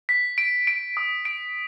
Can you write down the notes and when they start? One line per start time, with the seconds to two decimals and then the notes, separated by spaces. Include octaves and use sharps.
0.09 B6
0.38 D7
0.67 D7
0.97 D#6
1.25 D7